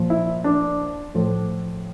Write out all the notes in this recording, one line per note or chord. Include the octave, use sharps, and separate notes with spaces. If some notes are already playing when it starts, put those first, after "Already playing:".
Already playing: A#2 F3
E4
D4
A2 F3